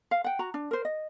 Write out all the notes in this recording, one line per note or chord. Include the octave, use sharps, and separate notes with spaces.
F5
F#5 G5
F#4 A#5
D4
A#4 C5
D#5